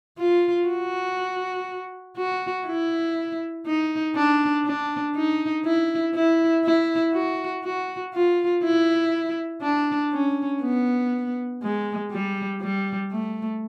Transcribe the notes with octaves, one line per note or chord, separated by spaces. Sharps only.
F4
F#4
F#4
E4
D#4
D4
D4
D#4
E4
E4
E4
F#4
F#4
F4
E4
D4
C#4
B3
G#3
G3
G3
A3